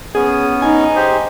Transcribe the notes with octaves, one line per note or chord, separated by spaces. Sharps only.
B3 C#4 G#4 D#6
D#4 G#5
G4 G#4 C5